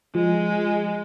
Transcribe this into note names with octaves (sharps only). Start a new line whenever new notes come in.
F3 G#3